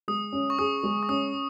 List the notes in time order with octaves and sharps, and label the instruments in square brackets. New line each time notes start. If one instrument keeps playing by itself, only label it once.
[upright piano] G#3 [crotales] D#6
[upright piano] C#4
[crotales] C#6
[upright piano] G#4 [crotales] D#6
[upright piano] G#3
[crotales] C#6
[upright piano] C#4 [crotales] D#6